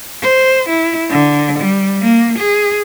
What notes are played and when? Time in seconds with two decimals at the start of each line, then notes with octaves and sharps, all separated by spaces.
0.22 C5
0.69 E4
1.10 D3
1.59 G3
2.02 A#3
2.39 G#4